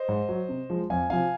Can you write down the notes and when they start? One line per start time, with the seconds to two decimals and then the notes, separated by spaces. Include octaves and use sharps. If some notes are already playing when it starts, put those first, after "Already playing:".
Already playing: C5 D#5
0.08 G#2
0.29 F#3
0.49 C3
0.70 F3 G#3
0.90 F2 F5 G#5
1.10 C3 F3 F5 G#5